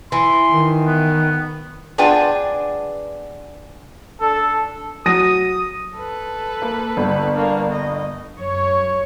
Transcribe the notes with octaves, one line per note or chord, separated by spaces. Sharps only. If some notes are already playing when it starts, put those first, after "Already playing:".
E3 C6
D#3
B3
B3 D4 F4 G#4 B4 G5
D4 A4
F#3 D#6 A#6 D#7
A4 B4
A#3
G1
A#3 D4
D#5
F#2 C#5